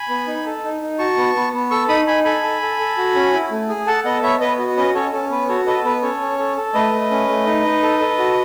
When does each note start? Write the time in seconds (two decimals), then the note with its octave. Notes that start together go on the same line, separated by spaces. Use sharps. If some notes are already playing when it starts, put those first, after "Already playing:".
Already playing: G#5 B5
0.09 B3
0.27 D#4
0.46 A4
0.64 D#4
0.81 D#4
0.99 F#4 A5 C#6
1.17 B3
1.36 B3
1.54 B3
1.70 A4 C#6 E6
1.88 D#4 B5 D#6
2.07 D#4 G#5 B5
2.24 A4 G#5 B5
2.43 A4
2.62 A4
2.79 A4
2.97 F#4
3.15 C#4
3.33 E4
3.51 A3
3.69 G#4
3.87 A4 F#5 A5
4.04 B3 D#5 F#5
4.22 B3 C#5 E5
4.40 B3 B4 D#5
4.59 F#4
4.77 C#4 B4 D#5
4.94 C#4 A4 C#5
5.13 C#4 A4
5.30 B3 B4
5.48 F#4 A4 C#5
5.66 A4 B4 D#5
5.84 B3 B4
6.02 C#4 A4 C#5
6.20 C#4
6.38 A4
6.57 A4
6.74 A3 B4 D#5
6.93 A3
7.11 C#4
7.29 A3
7.46 D#4
7.65 D#4
7.82 A4
8.00 A4
8.18 F#4